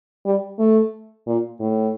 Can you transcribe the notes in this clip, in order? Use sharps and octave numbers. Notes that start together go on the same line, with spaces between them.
G3
A3
A#2
A2